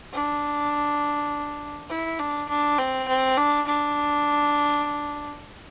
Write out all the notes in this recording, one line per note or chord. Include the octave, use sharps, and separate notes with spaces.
D4
E4
D4
D4
C4
C4
D4
D4